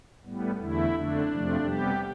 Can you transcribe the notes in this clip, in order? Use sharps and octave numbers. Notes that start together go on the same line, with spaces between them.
A2 G3 B3
E2 D3 A3 E4
F2 D3 A3 D4
F2 C3 F3 A3
C3 G3 B3 G4